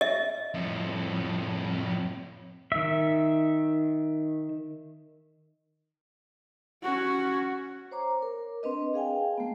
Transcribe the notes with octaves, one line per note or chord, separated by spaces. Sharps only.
D#5 E5
F2 A2
D#3 E5
C#4 F#4
C5 C#5 A#5 D6
A#4
C4 D4 B4 D#5
G#4 F5 G5 G#5
A3 B3